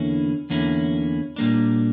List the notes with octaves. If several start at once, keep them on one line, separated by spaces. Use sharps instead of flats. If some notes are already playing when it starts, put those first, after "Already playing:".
Already playing: E2 D3 A#3 C#4 E4
E2 D3 A#3 C#4 E4
A#2 G3 A#3 D4